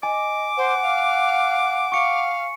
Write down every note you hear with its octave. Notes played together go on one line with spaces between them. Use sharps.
D#5 G#5 D6
C5 F#5
F5
F5 C#6 C#7